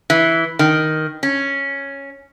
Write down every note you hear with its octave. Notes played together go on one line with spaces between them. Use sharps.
E3
D#3
C#4